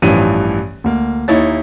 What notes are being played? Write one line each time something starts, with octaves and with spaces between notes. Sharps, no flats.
A1 G2 E3 F3 D#7
D2 A#3
D#2 D#4 E4 C#5 A6